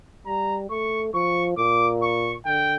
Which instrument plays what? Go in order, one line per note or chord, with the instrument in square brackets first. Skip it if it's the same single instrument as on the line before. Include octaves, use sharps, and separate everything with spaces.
[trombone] G3 [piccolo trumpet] A#5
[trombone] A3 [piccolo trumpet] C#6
[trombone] F3 [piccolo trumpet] C#6
[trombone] A#2 [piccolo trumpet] D6
[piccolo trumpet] C#6
[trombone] D3 [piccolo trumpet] G5